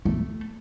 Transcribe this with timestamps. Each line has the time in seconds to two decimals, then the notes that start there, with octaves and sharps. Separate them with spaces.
0.05 A3